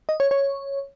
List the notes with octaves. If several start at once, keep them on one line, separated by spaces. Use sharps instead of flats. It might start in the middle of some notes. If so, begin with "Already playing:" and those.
D#5
C#5
C#5